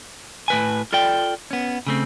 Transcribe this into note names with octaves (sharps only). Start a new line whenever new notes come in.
A2 B4 G#5
F4 A4 D5 G5
B3 C#4
C#3 A3 C4